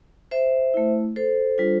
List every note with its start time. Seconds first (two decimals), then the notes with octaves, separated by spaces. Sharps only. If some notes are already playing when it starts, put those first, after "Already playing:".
0.31 C5 E5
0.74 A3 E4
1.16 A4 C5
1.58 G3 D4 F4